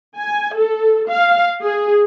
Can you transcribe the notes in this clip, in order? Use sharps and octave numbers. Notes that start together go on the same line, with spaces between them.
G#5
A4
F5
G#4